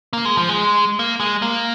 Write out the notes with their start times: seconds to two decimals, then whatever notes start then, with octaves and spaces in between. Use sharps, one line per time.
0.13 A#3
0.25 G#3
0.37 F3
0.49 G#3
0.99 A#3
1.20 G#3
1.42 A#3